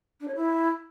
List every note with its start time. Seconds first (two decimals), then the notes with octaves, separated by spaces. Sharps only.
0.20 D4
0.28 C#5
0.35 E4